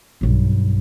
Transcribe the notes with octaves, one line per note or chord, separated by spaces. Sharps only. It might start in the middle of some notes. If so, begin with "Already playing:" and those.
B1 G2